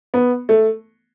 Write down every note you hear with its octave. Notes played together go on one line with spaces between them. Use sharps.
B3
A3